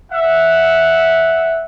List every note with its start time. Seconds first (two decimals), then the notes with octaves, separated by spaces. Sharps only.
0.11 E5 F#5